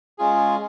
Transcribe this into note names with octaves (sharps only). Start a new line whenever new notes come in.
G#3 C#4 F4 G#4